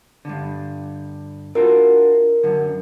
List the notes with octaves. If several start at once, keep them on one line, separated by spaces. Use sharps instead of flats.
G2 D3
D4 F4 F#4 A#4
F#2 D3